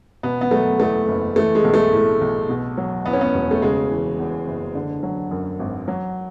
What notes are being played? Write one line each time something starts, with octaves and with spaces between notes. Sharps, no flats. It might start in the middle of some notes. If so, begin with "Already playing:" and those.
B2 B3
B3
F#3 A3
E2 A3
F#1
E3 A3
G#3
B1
A3
A2
B1
B2
F#3
E2 B3
C#4
B3
E1
A3
C#3 G#3
E3
E2
F#1
D3
F#3
F#2
G#1
F#3